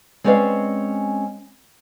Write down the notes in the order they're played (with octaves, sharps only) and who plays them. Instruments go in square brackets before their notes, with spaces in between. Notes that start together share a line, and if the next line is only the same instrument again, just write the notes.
[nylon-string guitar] G#3 C4 C#4 B4 D5 F5